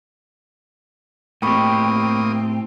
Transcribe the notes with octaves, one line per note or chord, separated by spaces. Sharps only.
A2 A#3 C4 G4 G5 B5 C#6 D#6